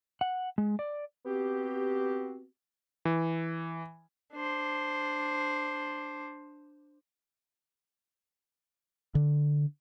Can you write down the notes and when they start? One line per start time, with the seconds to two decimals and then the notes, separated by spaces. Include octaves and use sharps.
0.21 F#5
0.58 G#3
0.79 D5
1.26 B3 C4 F#4 G4
3.05 E3
4.33 D4 C5
9.15 D3